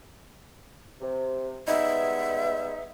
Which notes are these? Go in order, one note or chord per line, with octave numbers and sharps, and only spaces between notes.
C3
G3 G#3 B3 D#4 E5